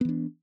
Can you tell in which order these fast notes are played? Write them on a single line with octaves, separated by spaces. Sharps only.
B3 E3 D4